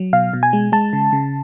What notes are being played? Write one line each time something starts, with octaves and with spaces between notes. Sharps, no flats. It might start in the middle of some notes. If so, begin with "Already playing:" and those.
Already playing: F#3
B2 F5
B2
G#5
G#3
G#3 A5
C#3
C#3